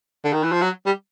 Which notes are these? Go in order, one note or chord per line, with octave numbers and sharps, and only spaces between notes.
D3
D#3
E3
F3
F#3
G3